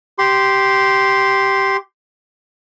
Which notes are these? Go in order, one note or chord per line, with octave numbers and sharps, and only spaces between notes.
G4 C6